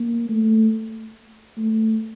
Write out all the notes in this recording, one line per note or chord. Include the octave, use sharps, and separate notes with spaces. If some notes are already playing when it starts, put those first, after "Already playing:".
Already playing: A#3
A3
A3